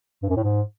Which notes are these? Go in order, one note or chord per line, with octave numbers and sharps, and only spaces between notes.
G2
F#2
A2
G#2